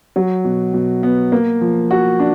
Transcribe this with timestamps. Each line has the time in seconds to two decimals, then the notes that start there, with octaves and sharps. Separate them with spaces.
0.16 F#3
0.45 B2
0.74 B2
1.03 B3
1.32 A#3
1.61 F3
1.91 F#4
2.20 D4